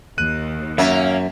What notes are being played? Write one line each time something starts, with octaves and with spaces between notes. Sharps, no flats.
D#2 F#6 D#7
F#2 A#3 C#4 E5